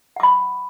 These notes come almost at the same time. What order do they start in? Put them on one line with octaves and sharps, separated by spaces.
F#5 D6 B5